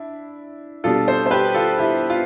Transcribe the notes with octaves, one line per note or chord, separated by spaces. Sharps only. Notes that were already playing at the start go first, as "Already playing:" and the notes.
Already playing: D4 E4
B2 G3 D4 F4 A4
A4 C5
C5
G4 B4
F4 A4
E4 G4
F4